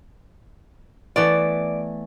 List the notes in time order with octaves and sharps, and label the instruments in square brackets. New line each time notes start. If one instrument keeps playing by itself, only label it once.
[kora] E3 A3 B3 [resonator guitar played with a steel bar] D5